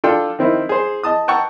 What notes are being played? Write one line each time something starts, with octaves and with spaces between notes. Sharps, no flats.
D4 F4 A4 F5 G5 C6
D#3 C4 E4
G#4 C5
D#5 A5 D#6
F#5 G5 A5 A#5 C#6 E6